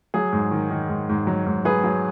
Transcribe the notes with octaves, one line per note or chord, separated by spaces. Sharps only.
F#3 G#4
G#2
D#3
D#3
G#2
G#2
F#3
G#2
F#3 G#4 B4
F#3